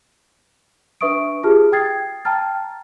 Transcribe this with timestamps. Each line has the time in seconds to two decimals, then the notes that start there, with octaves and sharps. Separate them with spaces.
1.01 D4 B4 E5 C#6 D#6 D7
1.43 F4 G4 G#4 A5 F6
1.72 G5 D#6 G#6 A6 C7
2.25 G5 A5 A#5 F6 A6